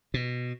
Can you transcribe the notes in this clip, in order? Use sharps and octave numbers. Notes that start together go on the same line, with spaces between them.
B2